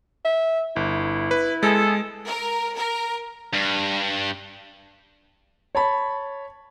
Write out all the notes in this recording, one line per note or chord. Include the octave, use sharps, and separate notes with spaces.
E5
G1 E4
B4
G#3 B3 G#4 A4
A#4
A#4
G2
C#5 A5 B5